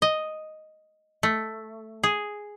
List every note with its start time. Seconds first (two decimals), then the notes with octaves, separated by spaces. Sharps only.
0.02 D#5
1.23 A3
2.03 G#4